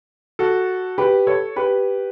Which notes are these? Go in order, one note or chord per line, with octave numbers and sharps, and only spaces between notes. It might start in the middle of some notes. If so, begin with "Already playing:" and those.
F#4 A4
G4 B4
A4 C#5
G4 B4